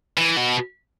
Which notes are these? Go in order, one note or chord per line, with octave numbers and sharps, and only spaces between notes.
E3
B2